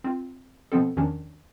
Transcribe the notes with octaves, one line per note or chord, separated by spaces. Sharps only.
C4 F4
B2 F3 B3 C4 A4
E2 D#3 F3 C#4 D4